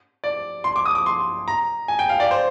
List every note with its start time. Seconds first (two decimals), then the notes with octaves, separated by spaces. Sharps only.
0.24 D5
0.64 C6
0.76 D6
0.86 D#6
0.95 D6
1.06 C6
1.48 A#5
1.88 G#5
1.99 G5
2.09 F5
2.20 D5
2.31 C5